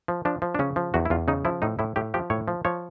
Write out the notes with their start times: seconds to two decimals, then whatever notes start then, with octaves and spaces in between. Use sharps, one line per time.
0.08 F3
0.25 F3 D4
0.42 F3
0.55 D4
0.59 C#3 C#4
0.76 F3
0.94 E2 F#4
1.05 E4
1.10 E2 F4
1.28 C#3 D#4
1.45 F3 E4
1.62 A2 D#4
1.79 A2 E4
1.96 A2 G4
2.14 F3 G4
2.30 A2 C#5
2.48 F3
2.65 F3 C#5